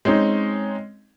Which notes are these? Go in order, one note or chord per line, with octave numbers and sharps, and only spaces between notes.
G#3 C4 C#4 D#4